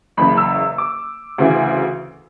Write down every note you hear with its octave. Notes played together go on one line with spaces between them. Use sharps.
F#1 E2 C#3 B5
E6
D6
D2 C#3 E3